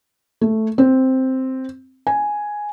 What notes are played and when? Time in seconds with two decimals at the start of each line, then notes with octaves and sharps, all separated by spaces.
0.41 A3
0.78 C4
2.07 G#5